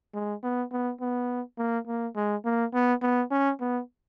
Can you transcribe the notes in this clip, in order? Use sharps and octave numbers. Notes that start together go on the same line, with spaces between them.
G#3
B3
B3
B3
A#3
A#3
G#3
A#3
B3
B3
C#4
B3